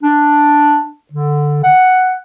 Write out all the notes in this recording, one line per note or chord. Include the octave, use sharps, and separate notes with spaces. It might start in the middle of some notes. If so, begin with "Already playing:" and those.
D4
D3
F#5